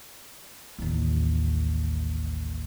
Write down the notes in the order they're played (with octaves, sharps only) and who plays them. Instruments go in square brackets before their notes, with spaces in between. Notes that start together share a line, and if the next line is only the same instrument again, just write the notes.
[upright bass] A1 D#2